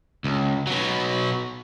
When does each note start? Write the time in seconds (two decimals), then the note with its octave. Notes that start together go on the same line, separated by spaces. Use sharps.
0.24 C#2
0.67 B2 F#3